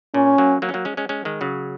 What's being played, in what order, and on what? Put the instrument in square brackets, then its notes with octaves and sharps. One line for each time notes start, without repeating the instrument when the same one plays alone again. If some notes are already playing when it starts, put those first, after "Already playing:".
[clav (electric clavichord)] A#2 [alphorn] C#4
[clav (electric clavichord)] F#3 A#3
F#3 A#3
C#4
F#3 A#3
G#3 C#4
G#3 C#4
G#3 C#4
D#3 G#3
C#3 F#3